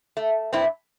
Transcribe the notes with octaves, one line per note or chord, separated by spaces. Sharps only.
A3
G2 C4 E4